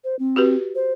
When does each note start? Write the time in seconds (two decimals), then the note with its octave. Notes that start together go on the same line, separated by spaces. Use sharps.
0.04 C5
0.19 C4
0.36 F#4 G4 B4
0.75 C5